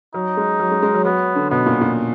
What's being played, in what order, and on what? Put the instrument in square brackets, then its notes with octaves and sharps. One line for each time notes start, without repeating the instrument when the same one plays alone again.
[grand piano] F#3 [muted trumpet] D#4
[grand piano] G#3
F#3
G#3
G#3
F#3
[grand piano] F#3 [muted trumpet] B3
[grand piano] D3
[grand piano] B2 [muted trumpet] B3
[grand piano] A#2
A#2